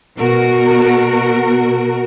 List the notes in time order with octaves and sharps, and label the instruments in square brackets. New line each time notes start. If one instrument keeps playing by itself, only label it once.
[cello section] B2 F#4 A#4